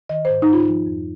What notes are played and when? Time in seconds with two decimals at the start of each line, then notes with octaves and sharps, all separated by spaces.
0.09 D#3 D#5
0.25 C5
0.30 G#2
0.42 D#4
0.48 G#2 F4
0.67 F3
0.86 F2